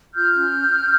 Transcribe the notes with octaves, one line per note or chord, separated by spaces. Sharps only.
F4 F6 G6
C#4